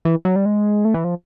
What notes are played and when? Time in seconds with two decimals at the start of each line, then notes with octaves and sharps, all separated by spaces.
0.05 E3
0.25 F#3
0.36 G3
0.45 G#3
0.85 A3
0.94 E3
1.04 F3